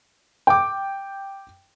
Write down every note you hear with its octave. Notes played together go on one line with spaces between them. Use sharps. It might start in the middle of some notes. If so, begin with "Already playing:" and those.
G5 D6